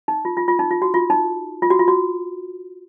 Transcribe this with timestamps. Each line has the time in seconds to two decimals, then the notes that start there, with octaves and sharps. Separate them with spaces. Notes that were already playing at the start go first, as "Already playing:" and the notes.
0.08 D#4
0.25 F4
0.37 F4
0.48 F4
0.59 D#4
0.71 F4
0.82 F#4
0.94 F4
1.10 D#4
1.62 F4
1.70 F#4
1.79 F4
1.88 F#4